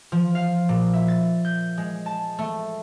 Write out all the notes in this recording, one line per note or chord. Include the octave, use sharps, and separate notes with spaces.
F3
F5
A#2
E5
A6
G6
G#3
A5
A3